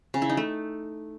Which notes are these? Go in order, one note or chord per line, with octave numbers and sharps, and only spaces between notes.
C#3
E4
D#4
A3